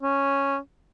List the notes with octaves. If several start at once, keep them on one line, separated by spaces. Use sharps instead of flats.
C#4